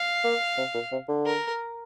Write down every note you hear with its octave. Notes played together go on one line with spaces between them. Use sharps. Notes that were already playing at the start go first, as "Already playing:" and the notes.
Already playing: F5
A#3
C3
A#2
C3
D3
A#4